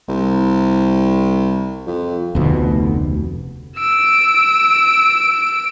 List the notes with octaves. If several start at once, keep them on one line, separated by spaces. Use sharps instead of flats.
C2
F2
F1 D2 B2
E6 D7